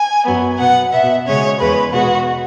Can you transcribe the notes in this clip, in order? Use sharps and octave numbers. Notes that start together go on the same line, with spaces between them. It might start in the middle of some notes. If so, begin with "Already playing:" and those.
Already playing: G#5
F#2 F#3 B3
B2 B3 F#5
B2 B3 E5
C#3 G#3 C#4 C#5
E2 C#3 G#3 B4
B2 G#3 B3 F#4